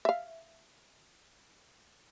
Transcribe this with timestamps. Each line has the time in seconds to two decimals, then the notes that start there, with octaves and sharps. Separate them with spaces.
0.05 E5 F5